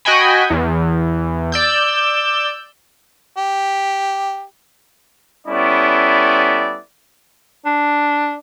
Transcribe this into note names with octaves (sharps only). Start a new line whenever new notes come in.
F#4 D#5 G5 G#5 B5
E2
D5 E6 G6
G4
G3 B3 C#4 E4 A4 D5
D4